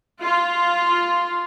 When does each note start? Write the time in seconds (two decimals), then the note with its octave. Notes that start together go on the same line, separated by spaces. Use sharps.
0.21 F4